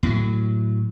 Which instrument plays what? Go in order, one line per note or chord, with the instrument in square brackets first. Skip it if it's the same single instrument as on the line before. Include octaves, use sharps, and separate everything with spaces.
[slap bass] A2 F#3